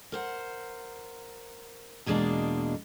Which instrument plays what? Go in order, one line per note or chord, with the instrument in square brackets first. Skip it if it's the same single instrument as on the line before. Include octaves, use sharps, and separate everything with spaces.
[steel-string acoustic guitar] A#4 C5 F#5
E2 B2 G#3 A#3 D4 A5